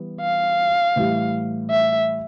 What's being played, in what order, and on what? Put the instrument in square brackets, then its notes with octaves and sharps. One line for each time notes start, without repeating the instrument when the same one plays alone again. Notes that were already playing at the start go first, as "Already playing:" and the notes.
Already playing: [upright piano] E3 G3 B3
[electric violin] F5
[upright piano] A2 E3 G3
[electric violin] E5